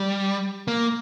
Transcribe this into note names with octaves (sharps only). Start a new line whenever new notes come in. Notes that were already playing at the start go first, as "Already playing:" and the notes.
Already playing: G3
A#3